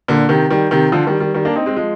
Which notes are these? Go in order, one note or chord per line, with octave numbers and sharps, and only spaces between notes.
A#2 D3
C3 D#3
D#3 G3
C3 D#3
D3 F3
D#3 G3
D#3 G3
D#3 G3
A#3 D4
C4 D#4
G#3 C4
F3 G#3